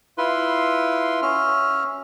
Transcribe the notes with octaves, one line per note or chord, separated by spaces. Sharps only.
E4 F4 B4 C6
C#4 F#4 E5 F6